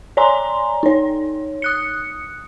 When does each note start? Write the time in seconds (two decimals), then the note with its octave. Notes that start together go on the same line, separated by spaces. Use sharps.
0.17 C#5 D5 G#5 A#5 C6
0.83 D#4 C#5
1.62 D#6 F#6 C#7